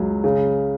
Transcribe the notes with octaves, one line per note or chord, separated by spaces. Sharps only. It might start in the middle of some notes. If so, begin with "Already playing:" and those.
Already playing: C#2 F#3
C#3